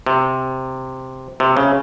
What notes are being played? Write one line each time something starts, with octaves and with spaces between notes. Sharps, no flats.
C3
C3
C#3